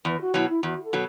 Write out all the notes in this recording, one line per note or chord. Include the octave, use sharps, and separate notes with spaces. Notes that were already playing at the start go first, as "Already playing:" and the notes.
E2 B4
F#4
B2 F#3 E4
E4
E2 F#4
A4
B2 F#3